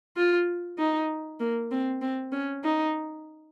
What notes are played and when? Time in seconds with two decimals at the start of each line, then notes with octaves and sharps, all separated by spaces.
0.17 F4
0.79 D#4
1.40 A#3
1.71 C4
2.02 C4
2.32 C#4
2.64 D#4